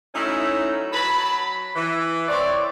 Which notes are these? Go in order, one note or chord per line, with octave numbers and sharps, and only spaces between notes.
F#3 A3 C#4 D#4 E4
F#3 A5 B5
E3
C4 C#5 D5